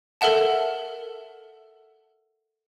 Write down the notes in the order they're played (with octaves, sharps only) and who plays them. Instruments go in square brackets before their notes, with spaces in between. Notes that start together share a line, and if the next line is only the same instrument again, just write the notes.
[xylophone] A4 A#4 E5 F#5 A5